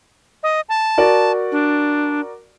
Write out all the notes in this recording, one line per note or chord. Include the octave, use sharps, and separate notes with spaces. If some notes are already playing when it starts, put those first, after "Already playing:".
D#5
A5
F#4 A#4 D5
D4